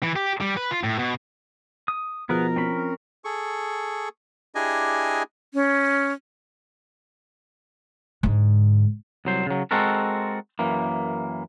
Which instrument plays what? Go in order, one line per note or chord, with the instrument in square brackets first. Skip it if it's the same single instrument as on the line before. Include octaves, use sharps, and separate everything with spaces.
[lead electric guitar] E3
G4
G3
B4
F4
A2
B2
[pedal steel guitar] D#6
[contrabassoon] B2 [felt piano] F3 [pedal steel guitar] B3 G#4 B4 [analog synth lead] A#4
[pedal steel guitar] C4 C#4 B5
[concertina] G#4 A4 C#6
D4 E4 G4 G#4 D#5 G#5
[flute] C#4
[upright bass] G#2 D3
[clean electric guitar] C2 F#3 C5
C#3 F#3
G#3 C4 F#4 A4 A#4
F#2 E3 A#3